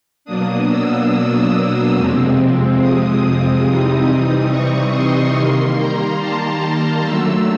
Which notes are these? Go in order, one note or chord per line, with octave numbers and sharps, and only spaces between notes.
B2 F#3 A#3 D4 D#6
E6
E6
F2 C3 F3 G#3 C4
D#6
D#6
C3 E3 G3 C4 D#4 D#6
D#6
C#6
C6
D#3 G3 A#3 C6
A#5
A5
A#5
D3 F#3 A3 E6